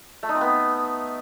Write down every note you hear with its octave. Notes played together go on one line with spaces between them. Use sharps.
A3
D#4
C4
B3